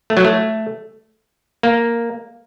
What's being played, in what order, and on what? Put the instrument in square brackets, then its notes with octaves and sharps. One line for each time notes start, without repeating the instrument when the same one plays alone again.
[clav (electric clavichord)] A3
F#3
A3
A#3